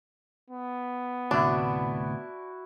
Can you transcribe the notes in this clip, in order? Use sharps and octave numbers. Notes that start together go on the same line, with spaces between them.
B3
D2 A2 C3 D4 E4 F#4